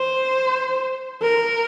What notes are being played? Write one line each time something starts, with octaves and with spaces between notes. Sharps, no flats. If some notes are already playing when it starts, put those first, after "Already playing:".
Already playing: C5
A#4